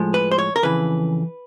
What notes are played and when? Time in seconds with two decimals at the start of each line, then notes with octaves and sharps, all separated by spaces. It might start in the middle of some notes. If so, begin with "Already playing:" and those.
Already playing: A2 F3 G#3
0.14 B4
0.31 C5
0.39 C#5
0.56 A#4
0.63 F2 C#3 E3 B4